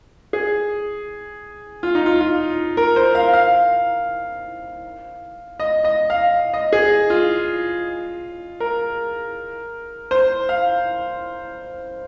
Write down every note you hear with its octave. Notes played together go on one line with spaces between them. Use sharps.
G#4
F4
D#4
F4
F4
A#4
C5
F5
F5
D#5
D#5
F5
D#5
G#4
F4
A#4
C5
F5